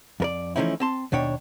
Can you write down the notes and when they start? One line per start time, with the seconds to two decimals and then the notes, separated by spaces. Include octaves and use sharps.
0.20 F2 A#4 D5
0.56 E3 F3 A3 C#4 D#4 E4
0.80 C4 A5 C6
1.12 D#2 B2 D4 C#5 G5